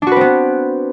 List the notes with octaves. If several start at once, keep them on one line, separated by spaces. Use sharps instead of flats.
B3 C4 D4 F#4 B4